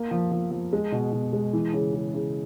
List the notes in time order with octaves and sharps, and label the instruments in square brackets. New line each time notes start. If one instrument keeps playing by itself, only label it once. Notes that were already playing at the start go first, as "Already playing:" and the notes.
Already playing: [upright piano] A#3
F3
F3
F3
G#3
B2
B2
G#3
E3
C#3
C#3
C#3